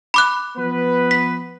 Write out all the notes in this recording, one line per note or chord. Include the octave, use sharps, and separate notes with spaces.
B5 D6 F#6
F3 B3 B4
B6